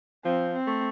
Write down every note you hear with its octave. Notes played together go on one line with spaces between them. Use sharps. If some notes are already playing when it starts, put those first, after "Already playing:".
F3 C4
C4
A3